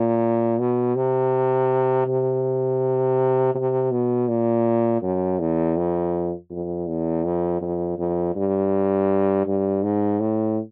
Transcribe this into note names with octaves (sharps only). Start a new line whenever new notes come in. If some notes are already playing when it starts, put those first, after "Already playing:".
Already playing: A#2
B2
C3
C3
C3
B2
A#2
F#2
E2
F2
F2
E2
F2
F2
F2
G2
G2
G#2
A2